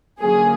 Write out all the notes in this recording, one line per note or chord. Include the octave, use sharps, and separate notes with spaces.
D3 F#3 A#3 C#4 G#4